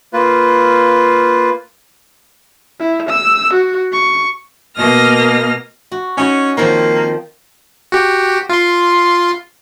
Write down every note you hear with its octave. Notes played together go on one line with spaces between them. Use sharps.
A#3 F4 B4
E4
E6
F#4
C#6
B2 A#3 D#5 F6 A#6
F#4
C#4 D#4 F#4 C#5
D#3 F3 A#3 C4
F#4 G4
F4 C6